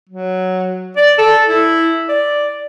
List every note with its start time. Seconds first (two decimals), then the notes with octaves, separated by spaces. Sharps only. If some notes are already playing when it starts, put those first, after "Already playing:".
0.09 F#3
0.97 D5
1.18 A4
1.48 E4
2.09 D5